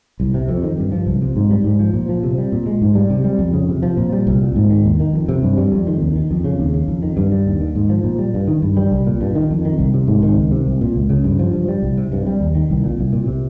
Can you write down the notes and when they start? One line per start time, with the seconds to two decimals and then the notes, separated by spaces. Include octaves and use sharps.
0.20 C2
0.34 C3
0.48 F2
0.63 D#3
0.78 G2
0.92 F3
1.07 C2
1.22 C3
1.36 G#2
1.51 G3
1.64 G#2
1.80 F3
1.94 A#2
2.09 F3
2.23 C3
2.38 G3
2.52 A#2
2.66 G#3
2.82 G#2
2.95 G3
3.10 C3
3.24 G3
3.39 F2
3.53 C#3
3.69 C3
3.83 F3
3.97 A#2
4.12 G3
4.27 C2
4.41 A#2
4.56 G#2
4.70 D#3
4.85 D#2
5.00 D#3
5.13 F2
5.29 C3
5.42 G2
5.58 G3
5.72 F2
5.87 D#3
6.01 D#2
6.16 D#3
6.31 F2
6.44 C#3
6.60 D#2
6.74 C#3
6.88 F2
7.02 D#3
7.17 G2
7.32 G3
7.46 D#2
7.61 D#3
7.75 G#2
7.89 F3
8.04 A#2
8.19 G3
8.34 G2
8.48 D#3
8.62 G2
8.77 G3
8.92 C2
9.07 A#2
9.21 G2
9.35 D#3
9.51 F2
9.65 D#3
9.79 C2
9.94 C3
10.07 G#2
10.23 D#3
10.37 C#2
10.51 C3
10.67 C2
10.81 A#2
10.96 C#2
11.10 C#3
11.24 G2
11.39 F3
11.53 G2
11.69 G3
11.83 C2
11.98 C3
12.12 G2
12.27 G3
12.40 D#2
12.55 D#3
12.70 C2
12.84 A#2
12.99 C2
13.13 A#2
13.27 C3